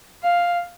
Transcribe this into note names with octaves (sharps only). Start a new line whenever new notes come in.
F5